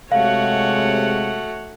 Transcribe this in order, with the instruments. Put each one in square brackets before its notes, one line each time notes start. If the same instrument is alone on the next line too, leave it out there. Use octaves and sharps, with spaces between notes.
[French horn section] C3 G#3 [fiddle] A3 F#4 [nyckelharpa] C#5 F#5 [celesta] F5